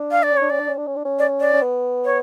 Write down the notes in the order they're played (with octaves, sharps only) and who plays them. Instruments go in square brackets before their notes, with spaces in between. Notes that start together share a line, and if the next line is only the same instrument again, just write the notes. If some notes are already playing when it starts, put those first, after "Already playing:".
Already playing: [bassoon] D4
[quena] F5
D5
[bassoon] C#4
[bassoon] D4 [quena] C#5
[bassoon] C#4 [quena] D5
[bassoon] D4
C#4
D4
C#4
D4
C#4
[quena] D5
D5
[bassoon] C#4
B3
[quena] C#5